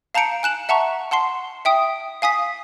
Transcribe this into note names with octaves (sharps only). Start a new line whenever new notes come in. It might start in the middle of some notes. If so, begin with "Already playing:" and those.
F5 A5 A#5 G6 C#7 D7
G#5 F#6 E7 F#7
E5 F#5 A5 A#5 C#6
F#5 A5 C6 C7
E5 G5 D#6
F5 G#5 D#6 B6